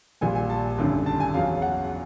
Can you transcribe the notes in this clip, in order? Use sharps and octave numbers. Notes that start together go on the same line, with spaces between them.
A#1 A#2 G3 G#5
G#5
A5
G#1 F#2 D3 G3
A5
G#5
E2 C#3 F#3 F5
F#5